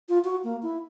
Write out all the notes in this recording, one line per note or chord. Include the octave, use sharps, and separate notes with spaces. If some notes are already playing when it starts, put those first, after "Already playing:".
F4
F#4
A#3
E4